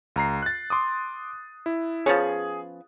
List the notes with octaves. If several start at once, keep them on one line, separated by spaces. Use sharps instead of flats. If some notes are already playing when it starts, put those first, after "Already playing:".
C#2 A#5 C7
F#6 A6
C6 D6 D#6
E4
F3 B3 C#4 G#4